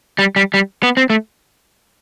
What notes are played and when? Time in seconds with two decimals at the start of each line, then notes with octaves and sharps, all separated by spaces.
0.19 G3
0.36 G3
0.54 G3
0.83 B3
0.97 C4
1.10 A3